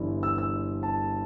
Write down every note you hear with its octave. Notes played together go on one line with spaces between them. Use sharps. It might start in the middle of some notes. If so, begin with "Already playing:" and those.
Already playing: G1 G2 E3
E6
E6
A5